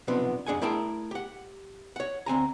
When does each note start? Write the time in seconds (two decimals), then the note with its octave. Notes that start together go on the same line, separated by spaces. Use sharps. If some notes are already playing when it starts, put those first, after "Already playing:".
0.08 B1 C3 F3 B3 D4
0.46 F2 D4 G#4 F#5 G#5
0.62 A3 E4 G#4 A#4 G5 A5
1.11 G4 F#5
1.96 C#5 F#5
2.26 D2 C4 G#5 A#5